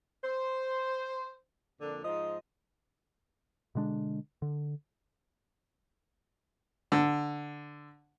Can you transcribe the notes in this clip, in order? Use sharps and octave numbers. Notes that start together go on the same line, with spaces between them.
C5
F2 A#2 D3 D4
G#2 F3 D#5
B2 D3 G#3 D4
D3
D3